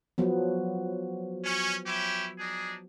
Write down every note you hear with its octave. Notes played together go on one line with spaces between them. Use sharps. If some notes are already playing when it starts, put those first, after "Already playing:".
F3 F#3 B3
C#4
C#4 E4 G4
D4 D#4 G#4